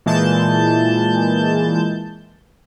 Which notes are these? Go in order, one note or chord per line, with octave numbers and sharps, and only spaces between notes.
A#2 E3 G#3 A5 G6